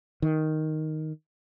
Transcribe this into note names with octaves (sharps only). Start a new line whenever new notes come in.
D#3